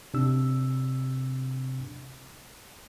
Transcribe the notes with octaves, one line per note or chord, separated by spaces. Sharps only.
C3 D4 E6